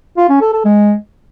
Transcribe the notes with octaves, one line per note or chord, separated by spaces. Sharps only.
F4
C#4
A4
A4
G#3